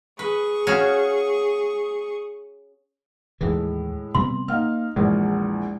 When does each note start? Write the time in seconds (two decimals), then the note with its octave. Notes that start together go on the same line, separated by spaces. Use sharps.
0.19 G#4 B4 C#6
0.67 C#4 F#4 F5
3.41 D#2 A2 D#3 E3 G#3 A3
4.15 C3 G3 B3 C6
4.48 A#3 D#4 F5 F6
4.96 A#1 E2 G#3